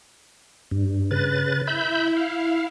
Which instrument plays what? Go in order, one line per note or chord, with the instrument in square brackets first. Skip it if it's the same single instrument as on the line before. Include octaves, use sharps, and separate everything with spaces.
[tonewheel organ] G2
C#3 B4 A6
[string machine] E4 [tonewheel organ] E5 B5 G6
[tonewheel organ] F5